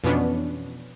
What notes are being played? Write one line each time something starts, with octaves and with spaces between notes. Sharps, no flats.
F2 B2 E3 B3 C#4 D4